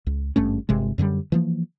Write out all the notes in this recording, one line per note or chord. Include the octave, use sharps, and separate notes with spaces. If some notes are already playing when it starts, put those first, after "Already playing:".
C#2
G#1 G2 A3 C#4
G1 C3 G#3
F#2 D3 E3 G3
E3 F3 A#3